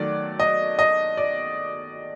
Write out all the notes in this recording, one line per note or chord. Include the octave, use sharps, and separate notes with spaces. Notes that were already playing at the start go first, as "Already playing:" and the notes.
Already playing: D#3 F#3 A3 D5
D#5
D#5
D5